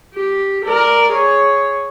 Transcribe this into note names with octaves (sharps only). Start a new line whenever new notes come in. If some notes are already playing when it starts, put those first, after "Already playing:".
G4
A#4 D5
G#4 C#5